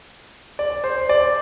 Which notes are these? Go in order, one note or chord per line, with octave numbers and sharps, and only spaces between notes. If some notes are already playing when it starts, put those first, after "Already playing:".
D5
C5
D5